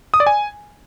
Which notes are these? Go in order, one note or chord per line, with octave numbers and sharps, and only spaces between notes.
D#6
D5
G#5